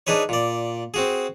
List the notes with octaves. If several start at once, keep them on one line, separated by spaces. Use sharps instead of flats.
D4 D#4 G#4 B4 C#5
A#2 D5
C4 F#4 G#4